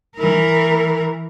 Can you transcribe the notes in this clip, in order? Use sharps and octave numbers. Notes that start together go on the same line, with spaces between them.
E3 A#4